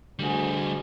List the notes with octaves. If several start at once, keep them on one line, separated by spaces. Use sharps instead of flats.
D2 D3 G3 F#4 G#4